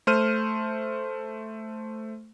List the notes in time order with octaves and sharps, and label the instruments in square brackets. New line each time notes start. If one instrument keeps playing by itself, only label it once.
[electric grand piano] A3 C5 F6 D#7